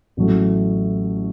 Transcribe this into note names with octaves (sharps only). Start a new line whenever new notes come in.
A1 A2 F#3 A3